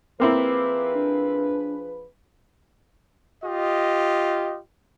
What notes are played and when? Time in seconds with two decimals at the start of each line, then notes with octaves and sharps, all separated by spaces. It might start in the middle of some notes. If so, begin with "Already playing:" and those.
0.20 F3 A#3 C4 E4 G#4 B4 D6
0.95 D4
3.43 F4 G4 D#5